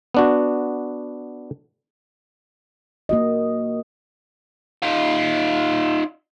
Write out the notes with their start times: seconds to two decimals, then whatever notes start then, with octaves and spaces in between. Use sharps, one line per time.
0.14 B3 D4 F#4
3.09 A#3 F#4 D#5
4.83 D#4 F4